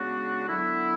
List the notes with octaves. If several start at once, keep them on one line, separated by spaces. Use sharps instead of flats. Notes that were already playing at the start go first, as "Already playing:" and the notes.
Already playing: C#3 G#3 B3 D4 F#4
D3 F#3 B3 E4